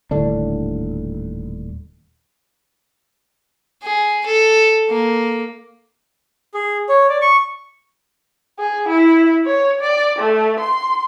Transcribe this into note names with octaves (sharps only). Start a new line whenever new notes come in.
D#1 A2 D3 D4
G#4
A4
A#3
G#4
C#5
D5
C#6
G#4
E4
C#5
D5
A3
C6